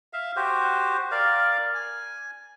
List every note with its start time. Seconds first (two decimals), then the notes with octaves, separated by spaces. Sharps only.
0.13 E5 F5
0.36 F#4 G4 C5
1.11 A#4 D5 F5
1.74 G#5